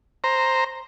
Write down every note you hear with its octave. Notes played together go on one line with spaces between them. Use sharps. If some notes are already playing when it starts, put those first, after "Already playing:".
C5 A#5